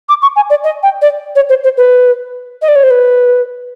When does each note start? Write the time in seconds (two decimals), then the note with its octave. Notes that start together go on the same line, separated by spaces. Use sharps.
0.09 D6
0.22 C#6
0.36 G#5
0.50 D5
0.64 D#5
0.83 G5
1.02 D5
1.35 C#5
1.49 C5
1.64 C5
1.77 B4
2.62 D#5
2.68 D5
2.75 C#5
2.83 C5
2.90 B4